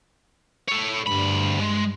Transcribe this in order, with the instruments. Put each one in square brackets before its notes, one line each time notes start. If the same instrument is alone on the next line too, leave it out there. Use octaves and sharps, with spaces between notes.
[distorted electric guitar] A4 C#5
[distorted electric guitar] D2 B5 [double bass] G2
[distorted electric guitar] G#3